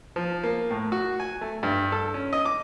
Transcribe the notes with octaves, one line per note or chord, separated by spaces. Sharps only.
F3
A#3
A2
F#4
G#5
A3
G2
A4
C#4
D#5
D6